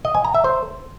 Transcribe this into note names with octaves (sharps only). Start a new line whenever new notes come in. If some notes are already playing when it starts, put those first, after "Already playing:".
D#5
G#5
A#5
E5
C5